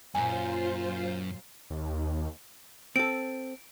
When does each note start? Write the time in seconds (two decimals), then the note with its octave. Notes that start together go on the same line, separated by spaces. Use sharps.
0.15 F#2 A#2 F#3 F4 C5 G#5
1.70 D#2
2.96 C4 A4 D7